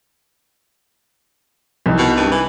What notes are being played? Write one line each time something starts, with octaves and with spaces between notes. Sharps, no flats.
C2 D#4
B2
G2
E3